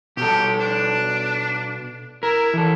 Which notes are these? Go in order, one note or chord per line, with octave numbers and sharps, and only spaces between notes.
B2 G4 A4
D4
E4 A#4
E3 A4